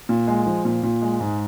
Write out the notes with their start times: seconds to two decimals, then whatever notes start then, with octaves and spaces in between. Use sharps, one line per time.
0.09 A#2
0.28 G#3
0.46 F3
0.65 A#2
0.83 A#2
1.02 G#3
1.20 G#2